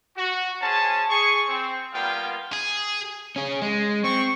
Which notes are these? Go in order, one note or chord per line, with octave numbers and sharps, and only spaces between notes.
F#4
C#4 G#4 C5 A5
G#4 C#6
C4
G3 A#3 B3 F4 F5 G5
G#4
C#4 G#4
G#3
C4 C#6